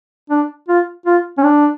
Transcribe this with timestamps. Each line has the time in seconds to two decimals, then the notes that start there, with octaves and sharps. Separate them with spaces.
0.30 D4
0.68 F4
1.06 F4
1.38 C#4
1.44 D4